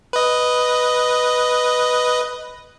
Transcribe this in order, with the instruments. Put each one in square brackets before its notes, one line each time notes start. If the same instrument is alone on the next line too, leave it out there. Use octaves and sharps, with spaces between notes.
[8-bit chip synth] B4 D#5